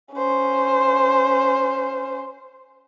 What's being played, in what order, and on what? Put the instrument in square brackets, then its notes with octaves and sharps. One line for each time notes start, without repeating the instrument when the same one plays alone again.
[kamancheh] C#4 C5